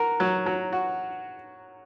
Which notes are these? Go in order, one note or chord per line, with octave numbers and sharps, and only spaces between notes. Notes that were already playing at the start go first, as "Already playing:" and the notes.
Already playing: F#4 A#4
F#3
F#3
F#4